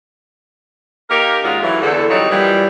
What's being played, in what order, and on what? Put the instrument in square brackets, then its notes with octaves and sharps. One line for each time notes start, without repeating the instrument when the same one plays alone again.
[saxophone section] A#3 D#4 G4 A#4
D#2 A#2 G#3 C#4 F4 F#4
E3 F#3 A3
E2 D3 A4
F#3 G3 C4 D#4 F4 C#5
A#2 E3 F3 G3